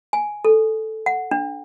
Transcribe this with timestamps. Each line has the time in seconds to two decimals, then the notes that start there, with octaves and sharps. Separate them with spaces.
0.13 G#5
0.45 A4
1.06 F#5
1.31 D4